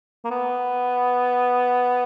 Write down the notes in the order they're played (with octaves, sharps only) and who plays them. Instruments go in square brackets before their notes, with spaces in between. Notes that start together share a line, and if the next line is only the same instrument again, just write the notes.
[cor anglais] A#3
B3